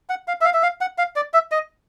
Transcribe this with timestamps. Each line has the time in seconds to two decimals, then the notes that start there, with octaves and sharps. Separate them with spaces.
0.09 F#5
0.28 F5
0.41 E5
0.45 F5
0.54 E5
0.63 F5
0.81 F#5
0.98 F5
1.16 D5
1.34 E5
1.52 D#5